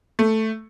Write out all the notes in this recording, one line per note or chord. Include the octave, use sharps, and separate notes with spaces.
A3